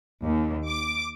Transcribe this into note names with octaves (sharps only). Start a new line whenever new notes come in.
D#2
D6